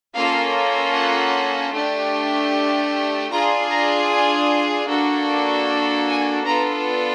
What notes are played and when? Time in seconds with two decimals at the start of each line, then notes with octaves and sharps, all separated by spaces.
0.15 A#3 C#4 F4 A4 F5
0.93 F#5
1.72 A3 D4 G4
3.31 D4 F4 G#4 A#5
3.70 A#5
4.10 G#5
4.88 A#3 D4 F#4 A4
6.08 G#5
6.46 B3 D4 F4 A4 A#5